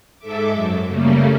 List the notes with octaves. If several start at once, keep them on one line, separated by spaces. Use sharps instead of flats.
G#2 A4 E5 D6
F#2
C#3 G3 A3 A#3